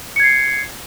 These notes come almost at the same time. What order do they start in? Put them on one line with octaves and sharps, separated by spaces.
C#7 G#6 C7